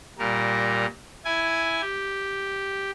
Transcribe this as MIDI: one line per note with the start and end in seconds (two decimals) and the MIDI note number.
0.19 0.86 46
0.19 0.86 55
0.19 0.86 70
1.25 1.81 64
1.25 1.81 80
1.82 2.91 67